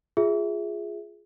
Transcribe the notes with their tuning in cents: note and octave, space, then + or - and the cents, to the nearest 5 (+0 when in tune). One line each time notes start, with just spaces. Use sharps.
F4 +0 G#4 +0 E5 +0